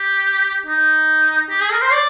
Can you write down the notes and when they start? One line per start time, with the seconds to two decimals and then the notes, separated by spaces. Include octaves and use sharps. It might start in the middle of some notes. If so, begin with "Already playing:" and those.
Already playing: G4
0.67 D#4
1.50 G4
1.61 G#4
1.72 A#4
1.82 C5
1.93 D5